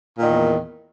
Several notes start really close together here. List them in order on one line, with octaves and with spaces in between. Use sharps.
A#2 D#3 E2